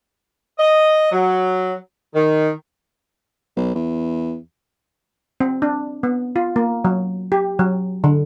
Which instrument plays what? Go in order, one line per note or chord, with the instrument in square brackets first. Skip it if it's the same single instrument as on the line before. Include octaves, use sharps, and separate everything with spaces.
[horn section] D#5
F#3
D#3
[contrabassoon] B1
E2
[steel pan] C4
D4
B3
F4
A#3
F#3
G4
F#3
D3